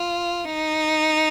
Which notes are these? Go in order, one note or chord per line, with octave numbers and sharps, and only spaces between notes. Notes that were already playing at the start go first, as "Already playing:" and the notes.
Already playing: F4
D#4